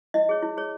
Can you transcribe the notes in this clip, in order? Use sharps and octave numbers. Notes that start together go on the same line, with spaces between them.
E4 D#5
G#4 C#5
E4
G#4 C#5